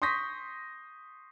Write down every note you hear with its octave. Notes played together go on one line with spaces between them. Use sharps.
C6 C#6 D#6 G6 A#6 B6